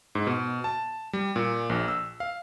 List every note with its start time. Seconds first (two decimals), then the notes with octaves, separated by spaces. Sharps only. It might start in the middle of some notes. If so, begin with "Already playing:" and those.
0.15 G#2
0.27 B2
0.64 A5
1.13 G3
1.36 A#2
1.70 A#1
1.88 E6
2.20 F5